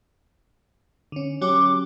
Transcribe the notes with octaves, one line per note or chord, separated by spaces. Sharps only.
D3 C#4
F#3 C#4 G4 D6